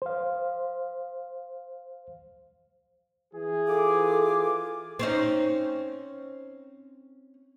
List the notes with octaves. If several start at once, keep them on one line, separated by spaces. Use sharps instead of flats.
C5 F5
E3 G#4
F4 A4 D6
C4 C#4 D#4